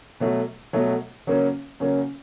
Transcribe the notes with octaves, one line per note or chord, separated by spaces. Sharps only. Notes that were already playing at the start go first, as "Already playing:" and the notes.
B2 F#3 A3
B2 F#3 A3
C#3 F#3 A#3 C#4
C#3 F#3 A#3 C#4